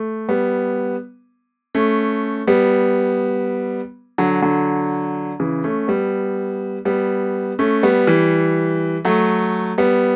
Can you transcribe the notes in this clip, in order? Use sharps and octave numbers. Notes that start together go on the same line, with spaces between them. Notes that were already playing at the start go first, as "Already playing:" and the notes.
Already playing: A3
G3 B3
A3 C#4
G3 B3
D3 F#3
D3 F#3
C#3 E3
A3 C#4
G3 B3
G3 B3
A3 C#4
G3 B3
E3 G3
F#3 A3
G3 B3